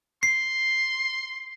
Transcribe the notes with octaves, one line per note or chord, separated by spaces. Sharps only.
C6 C7